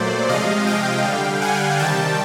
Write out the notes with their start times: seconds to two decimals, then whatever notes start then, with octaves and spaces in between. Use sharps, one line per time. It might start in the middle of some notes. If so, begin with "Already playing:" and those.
Already playing: A#2 F#3 A3 C5 D5
0.29 C3 F3 G#3 D#5 F5
0.67 F5 G5
1.04 D3 G3
1.41 F#5 G#5
1.79 C3 D#3 G3 G5 A5